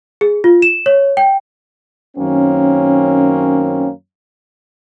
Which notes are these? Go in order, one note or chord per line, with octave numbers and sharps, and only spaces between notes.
G#4
F4
E7
C#5
G5
F#2 D#3 A#3 C4 C#4